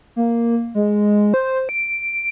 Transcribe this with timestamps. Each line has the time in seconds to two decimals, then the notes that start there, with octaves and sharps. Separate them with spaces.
0.16 A#3
0.75 G#3
1.34 C5
1.69 D7